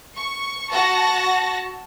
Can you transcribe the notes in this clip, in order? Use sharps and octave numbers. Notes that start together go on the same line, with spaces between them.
C#6
F#4 A5 A#6